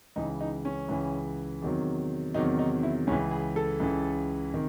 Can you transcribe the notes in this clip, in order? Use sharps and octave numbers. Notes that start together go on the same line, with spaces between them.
C#2 C#3 E3 D#4
D#4
C#4
C#2 C#3 E3
E2 C3 D#3 F#3
E2 C3 D#3 F#3 D#4
D#4
E4
C#2 C#3 E3 C#4
G#4
A4
C#2 C#3 E3
C3 D#3